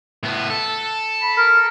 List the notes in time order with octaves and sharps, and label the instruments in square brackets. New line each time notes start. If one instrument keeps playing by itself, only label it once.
[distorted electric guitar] A2 B3
A4
[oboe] B5
A#4